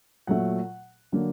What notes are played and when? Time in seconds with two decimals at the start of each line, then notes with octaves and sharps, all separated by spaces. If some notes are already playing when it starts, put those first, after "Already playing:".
0.27 A#2 F#3 A3 F#5
1.12 D3 F#3 A#3